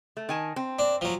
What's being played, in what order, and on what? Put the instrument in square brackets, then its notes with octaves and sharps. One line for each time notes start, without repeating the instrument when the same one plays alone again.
[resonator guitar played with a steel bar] A3
D#3 G#5 A5
C4
[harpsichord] D4
F3 F#3